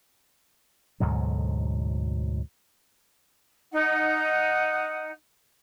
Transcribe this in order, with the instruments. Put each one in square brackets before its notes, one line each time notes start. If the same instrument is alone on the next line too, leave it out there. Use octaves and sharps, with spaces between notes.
[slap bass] D2 G#2 B2 F#3
[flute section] D#4 F#5